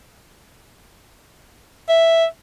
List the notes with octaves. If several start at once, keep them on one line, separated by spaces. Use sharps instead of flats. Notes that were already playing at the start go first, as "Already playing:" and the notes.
E5